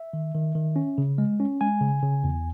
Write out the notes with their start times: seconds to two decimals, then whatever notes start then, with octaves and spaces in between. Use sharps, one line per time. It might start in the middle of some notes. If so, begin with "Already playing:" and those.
Already playing: E5
0.13 D#3
0.34 D#3
0.55 D#3
0.76 C#4
0.98 C#3
1.18 G#3
1.40 C#4
1.61 G#3 G#5
1.81 C#3
2.03 C#3
2.24 E2